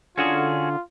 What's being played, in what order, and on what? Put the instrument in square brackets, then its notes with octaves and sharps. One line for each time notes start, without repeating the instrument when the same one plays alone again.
[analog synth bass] D3 [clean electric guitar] C#4 F#4 G#4 [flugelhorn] F4